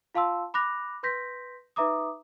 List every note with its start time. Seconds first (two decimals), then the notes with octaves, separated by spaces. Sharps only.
0.15 F4 F5 A5 C6 E6
0.54 B5 D6 F#6 A#6 F7
1.03 B4 C6 G6 A#6 B6
1.76 D#4 B4 E5 A#5 D6 D#6